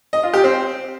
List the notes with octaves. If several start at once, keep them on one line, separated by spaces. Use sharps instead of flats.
D#5
F4
G4
C4